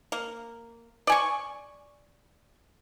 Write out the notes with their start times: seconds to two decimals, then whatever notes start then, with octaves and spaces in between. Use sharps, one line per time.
0.12 A#3
1.07 D5 G#5 C#6